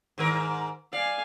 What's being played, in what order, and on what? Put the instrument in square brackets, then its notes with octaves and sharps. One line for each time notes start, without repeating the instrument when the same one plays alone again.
[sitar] G#2 D#3 A#4
[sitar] D5 [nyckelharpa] F5 G#5